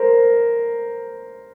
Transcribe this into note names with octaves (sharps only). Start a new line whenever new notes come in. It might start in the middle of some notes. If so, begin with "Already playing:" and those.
Already playing: A#4 C5